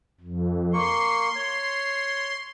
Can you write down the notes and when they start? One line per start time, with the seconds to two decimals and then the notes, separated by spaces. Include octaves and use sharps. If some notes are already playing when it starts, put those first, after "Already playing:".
0.21 F2
0.74 A#3 C6 C#6
1.35 C#5